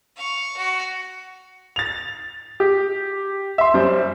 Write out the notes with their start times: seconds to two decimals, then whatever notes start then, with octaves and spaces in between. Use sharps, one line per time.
0.16 F5 C#6
0.57 F#4
1.76 A6 F7
2.60 G4
3.58 E5 C6
3.74 F#2 G3 C5